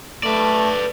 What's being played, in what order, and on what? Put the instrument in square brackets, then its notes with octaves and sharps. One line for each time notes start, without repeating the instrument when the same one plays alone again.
[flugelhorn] A3 [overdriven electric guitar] B4 D5